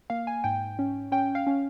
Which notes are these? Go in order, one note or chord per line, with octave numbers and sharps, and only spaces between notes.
A#3 F5
G#5
G#2 G5
C#4
C#4 G5
F5
C#4